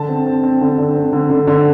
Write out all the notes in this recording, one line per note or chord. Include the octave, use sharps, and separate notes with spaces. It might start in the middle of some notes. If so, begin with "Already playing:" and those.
Already playing: D3 A5
C4
C4
C4
D3
D3
C4
D3
D3
D3